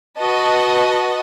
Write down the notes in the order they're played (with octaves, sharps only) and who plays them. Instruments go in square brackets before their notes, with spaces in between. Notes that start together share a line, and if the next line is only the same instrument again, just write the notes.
[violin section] F#4 B4 D#5 A5